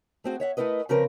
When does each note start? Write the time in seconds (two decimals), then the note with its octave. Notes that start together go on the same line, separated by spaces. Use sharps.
0.24 A3 C4 F#4 G#4
0.40 C#5 E5 F#5
0.57 A3 E4 A#4 B4 D#5
0.89 C#3 F3 C4 A#4 B4